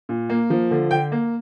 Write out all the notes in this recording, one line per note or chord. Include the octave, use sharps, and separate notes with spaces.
A#2
A#3
F3
D3
D3 G5
A#3